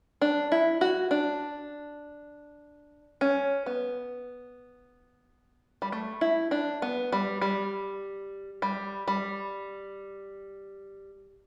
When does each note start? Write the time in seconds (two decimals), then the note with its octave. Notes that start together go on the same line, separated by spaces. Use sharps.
0.21 D4
0.52 E4
0.81 F#4
1.11 D4
3.21 C#4
3.66 B3
5.82 G3
5.92 A3
6.21 E4
6.51 D4
6.82 B3
7.12 G3
7.41 G3
8.62 G3
9.08 G3